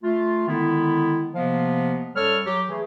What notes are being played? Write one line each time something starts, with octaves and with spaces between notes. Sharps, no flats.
A3 F4
D3 D#3 G#3 B3 E4
C3 F3 A#3 B3 D#5 F5
F#2 G3 A4 C#5 F6
F#3 G4
E3 A3 G#4